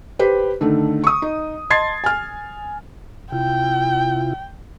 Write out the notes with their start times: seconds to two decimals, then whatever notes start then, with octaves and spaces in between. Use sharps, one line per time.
0.19 G4 B4 C5
0.61 D3 D#3 A3
1.04 C#6 D#6
1.22 D#4
1.70 D#5 A5 C6 G#6 A6 C7
2.04 G#5 F6
3.32 C3 E4 F4 G5